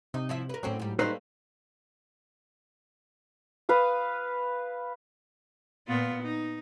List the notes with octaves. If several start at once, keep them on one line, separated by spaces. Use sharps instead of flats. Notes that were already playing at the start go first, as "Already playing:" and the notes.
C3 D#4
F3 E4 E5
A#4 B4
A2 D3 F#3 C4 C#4
G#2 G3
G3 A3 A#3 D#4 B4 C5
B4 F5 D#6
A#2 B3 F4
D#4